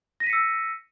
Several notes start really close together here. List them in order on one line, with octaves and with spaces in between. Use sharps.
A#6 D#7 B6 C#7 E6